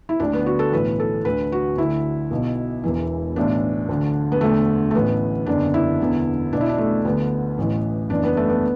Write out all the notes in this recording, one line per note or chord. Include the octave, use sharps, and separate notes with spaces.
E4
D2 D3 D4
B3
F#4
A4
B1 A2 E3 B4
A4
D2 D3 B4
F#4
D2 D3 E4
B1 B2
E1 E2 E3
B1 A2 E3 D4
D2 D3
B3
E1 D2 D3 A3
A3
A1 A2 E3 B3
F#1 E2 D3 D4
E4
E1 E2 D3
B1 B2 D4
E4
D4
A3
D2 D3 B3
A1 A2 E3
F#1 E2 E3 D4
B3
A3
B3